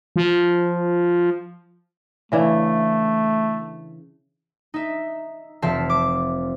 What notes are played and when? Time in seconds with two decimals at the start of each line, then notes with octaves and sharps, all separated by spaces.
0.16 F3
2.32 C#3 E3 A3 D4
4.74 D#4 E5
5.62 F1 F3 C4 E5 F5 A5
5.90 D6